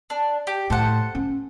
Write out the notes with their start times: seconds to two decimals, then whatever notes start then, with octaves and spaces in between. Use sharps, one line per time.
0.10 D4
0.47 G4
0.70 A2 A4 C5 F#5
1.15 C#4